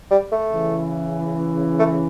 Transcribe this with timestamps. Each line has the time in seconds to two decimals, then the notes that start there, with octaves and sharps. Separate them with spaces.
0.11 G3
0.32 A3
0.52 C#3 E3
1.79 A3